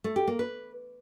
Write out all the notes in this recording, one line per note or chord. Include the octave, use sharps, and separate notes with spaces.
A3
G4
A#3
B4